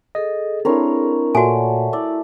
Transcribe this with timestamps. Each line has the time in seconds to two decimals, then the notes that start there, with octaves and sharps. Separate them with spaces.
0.15 G#4 A4 D#5
0.65 C4 D4 E4 A#4 C#5 C6
1.35 A#2 A3 F#4 C#5 D5 F#5 G#5
1.93 E4 D5